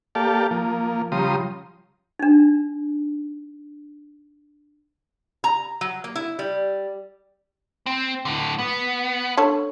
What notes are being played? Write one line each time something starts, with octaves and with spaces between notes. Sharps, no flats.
A#3 G4 A4 D5 F5 A5
F3 A#3
C#3 F3 G3 A#5 C6 D#6
D4 D#4
A#5
F#3
A#3
E4
G3
C4
A2 D3
B3
D3 C#5 A5